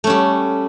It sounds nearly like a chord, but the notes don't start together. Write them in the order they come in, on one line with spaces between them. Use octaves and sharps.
A3 C#4 G3